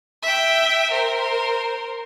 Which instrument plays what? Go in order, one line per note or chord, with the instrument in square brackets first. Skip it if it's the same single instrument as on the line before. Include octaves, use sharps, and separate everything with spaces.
[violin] E5 G5
A#4 C5